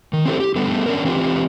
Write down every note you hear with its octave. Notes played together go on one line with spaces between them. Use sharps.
D#3
C4 C#4 E4 G4 A4 C5
G4
D3 G3 A3 B3
C#4 D4 A#4
E3 C4 F4 G4